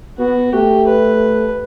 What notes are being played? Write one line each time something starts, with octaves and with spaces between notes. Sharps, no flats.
B3 F#4
A3 G4
B4